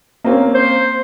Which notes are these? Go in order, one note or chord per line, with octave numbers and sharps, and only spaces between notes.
A#3 C4 C#4
C5